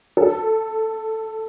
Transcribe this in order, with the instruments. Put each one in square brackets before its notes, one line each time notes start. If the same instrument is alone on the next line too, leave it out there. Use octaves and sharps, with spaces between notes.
[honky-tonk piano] A4